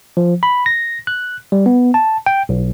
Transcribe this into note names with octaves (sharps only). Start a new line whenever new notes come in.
F3
B5
A#6
F#6
G3
B3
A5
G5
B1